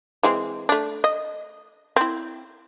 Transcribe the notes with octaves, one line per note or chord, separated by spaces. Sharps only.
E3 G#3 C4
A3 D4
D#5
C4 E4